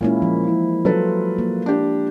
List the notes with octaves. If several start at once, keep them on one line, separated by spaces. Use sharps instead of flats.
A#2 G#3 A#3 C#4 E4
F3
E3
F#3 F4 A4 B4
A#3
D4 G4